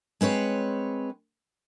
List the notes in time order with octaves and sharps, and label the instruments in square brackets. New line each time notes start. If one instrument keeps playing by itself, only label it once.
[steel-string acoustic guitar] G#3 C4 B4 C#5